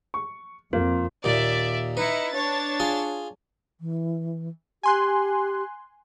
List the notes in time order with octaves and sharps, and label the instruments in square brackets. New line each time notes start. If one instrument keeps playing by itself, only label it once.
[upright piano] C#6
[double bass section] F2 [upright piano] A#3 [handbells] F4
[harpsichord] D#2 A#2 [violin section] D5 E5
[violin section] D#4 E4 C#7 [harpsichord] B4
[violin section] D4 C#5 A6
[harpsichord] F4 G#4
[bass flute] E3
[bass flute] G4 [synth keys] G#5 C6 F#6